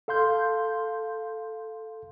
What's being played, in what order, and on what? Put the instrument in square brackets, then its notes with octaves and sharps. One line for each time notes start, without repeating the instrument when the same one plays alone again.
[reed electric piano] A4 F5 C6 G6